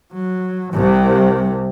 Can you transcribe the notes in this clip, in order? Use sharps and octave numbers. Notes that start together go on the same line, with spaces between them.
F#3
C2 C3